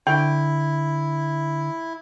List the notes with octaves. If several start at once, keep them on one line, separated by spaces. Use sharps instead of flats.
D3 E4 G5